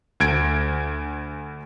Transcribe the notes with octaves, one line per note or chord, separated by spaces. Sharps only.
D2 G#6 D7